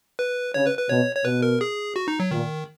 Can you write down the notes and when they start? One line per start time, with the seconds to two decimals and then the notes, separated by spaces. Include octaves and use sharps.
0.19 B4
0.54 C#3 C#5
0.66 B4
0.78 B4
0.89 B2 C#5
1.16 C#5
1.25 B2 B4
1.42 A#4
1.61 G#4
1.96 F#4
2.08 D#4
2.20 F#3
2.31 A#2 D#3